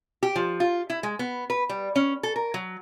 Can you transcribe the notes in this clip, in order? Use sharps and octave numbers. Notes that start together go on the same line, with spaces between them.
G4
F3
F4
E4
G#3
B3
B4
G3
C#4
A4
A#4
F#3